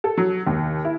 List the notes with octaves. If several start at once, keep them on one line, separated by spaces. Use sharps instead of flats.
A4
F#3
D#2
E4